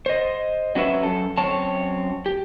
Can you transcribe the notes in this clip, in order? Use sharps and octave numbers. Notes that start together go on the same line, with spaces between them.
C5 D#5
F#3 C#4 F#4 B4 E5
F#2 A4
F#2 C4 C#5 A5
G4